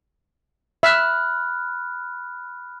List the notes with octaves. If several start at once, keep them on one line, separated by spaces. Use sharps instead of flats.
E5 B5 F6 F#6